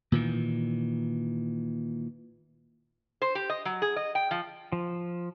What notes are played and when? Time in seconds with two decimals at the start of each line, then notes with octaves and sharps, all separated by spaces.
0.12 A#2 D#3 E3
3.22 C5
3.35 G4
3.50 D#5
3.65 F#3
3.82 G#4
3.96 D#5
4.15 G5
4.31 F3
4.72 F3